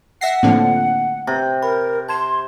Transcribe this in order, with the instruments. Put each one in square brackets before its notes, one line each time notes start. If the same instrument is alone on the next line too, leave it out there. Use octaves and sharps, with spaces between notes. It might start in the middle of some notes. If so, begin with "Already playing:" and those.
[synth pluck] E5 A#6 C7 [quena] F#5
[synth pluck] A2 D3 F3 [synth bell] A#3 C4 A4
[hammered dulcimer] C3 [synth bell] A#5
[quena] A#4 [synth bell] B5
[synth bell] A5 G#6 E7 [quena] C6